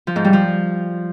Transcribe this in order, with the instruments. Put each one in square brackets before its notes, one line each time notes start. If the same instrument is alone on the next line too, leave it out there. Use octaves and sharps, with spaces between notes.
[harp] F3
G#2
G3
F3